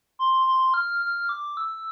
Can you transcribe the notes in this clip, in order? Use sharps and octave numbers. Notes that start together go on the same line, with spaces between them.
C6
C6
F6
F6
D6
E6